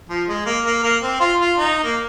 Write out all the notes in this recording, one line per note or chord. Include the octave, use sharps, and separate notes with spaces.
F3
G#3
A#3
A#3
A#3
C4
F4
F4
D#4
A#3